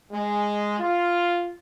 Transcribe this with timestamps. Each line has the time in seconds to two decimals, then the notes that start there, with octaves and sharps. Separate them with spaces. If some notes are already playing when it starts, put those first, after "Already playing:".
0.11 G#3
0.79 F4